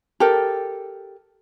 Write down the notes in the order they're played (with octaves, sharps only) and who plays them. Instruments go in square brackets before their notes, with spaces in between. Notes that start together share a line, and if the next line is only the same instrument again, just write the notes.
[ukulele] G4 A4 A#4